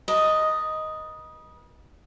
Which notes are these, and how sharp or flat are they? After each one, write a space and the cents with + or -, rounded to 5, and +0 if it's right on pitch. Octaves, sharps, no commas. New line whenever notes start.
B4 -40 D#5 +0 A5 +25